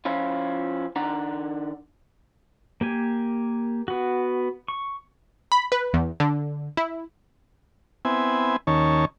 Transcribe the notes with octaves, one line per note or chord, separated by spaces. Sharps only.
F3 C#4 E4 F4
D#3 D4 F#5 A#5
A#3 G4 G#5
B3 F#4
C#6
B5
B4
E2
D3
E4
B3 C4 E4 G#5
D#2 D#3 C#4 C#5 A5